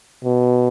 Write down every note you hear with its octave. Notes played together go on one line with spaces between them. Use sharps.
B2